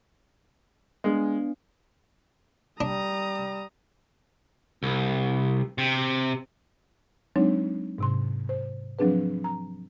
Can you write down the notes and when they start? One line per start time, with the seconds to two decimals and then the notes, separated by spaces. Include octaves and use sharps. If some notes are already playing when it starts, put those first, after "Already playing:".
1.04 G#3 B3 D4
2.81 G3 D4 A#5 D#6
4.83 C2
5.78 C3
7.36 F#3 G#3 C4 D4 D#4 C#5
7.98 G#2 C3 C6
8.49 C5
8.99 F3 F#3 C4 D4 G#4 B4
9.44 A#5